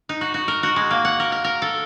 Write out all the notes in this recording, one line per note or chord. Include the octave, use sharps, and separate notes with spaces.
D#4
F#4
F#4
A#4
F#4
G#3
A#3
F#5
A#4
A#4
A#4
A4